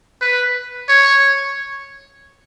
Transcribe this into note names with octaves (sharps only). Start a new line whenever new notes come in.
B4
C#5